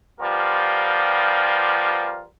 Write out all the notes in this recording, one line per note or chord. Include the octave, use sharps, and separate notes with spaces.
F3 G3 B3 F4 G4 A#4